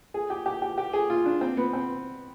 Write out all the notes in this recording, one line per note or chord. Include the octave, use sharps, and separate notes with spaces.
G#4
G4
G4
G4
G4
G#4
F4
D4
C4
B3
C4